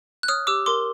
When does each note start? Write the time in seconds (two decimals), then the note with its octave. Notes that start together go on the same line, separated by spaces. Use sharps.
0.23 F#6
0.28 C#5 D#6 F6
0.47 G4 D6 E6
0.66 A#4 C6 D6